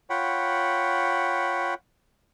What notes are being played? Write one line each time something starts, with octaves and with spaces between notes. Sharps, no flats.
F4 C#5 F#5 G5 B5